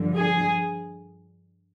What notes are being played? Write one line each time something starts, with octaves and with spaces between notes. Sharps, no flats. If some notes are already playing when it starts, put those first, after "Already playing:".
Already playing: G2 D3 F3
G#4